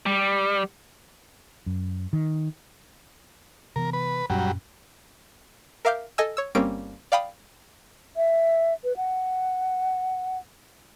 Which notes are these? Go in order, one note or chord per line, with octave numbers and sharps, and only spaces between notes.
G3
F#2
D#3
C3 E3 B3 A#4
B4
F#2 A#2 F#3 G3 C#4
A#4 E5 F5 D6 F6 G6
A4 D#5 G#5 E6
C#5 E6
G1 G3 A#3 C4 C#4 D7
D5 F5 G5 B5 D#6
E5
B4
F#5